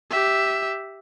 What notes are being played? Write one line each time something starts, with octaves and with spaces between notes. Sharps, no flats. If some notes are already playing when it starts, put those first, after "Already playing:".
G4 E5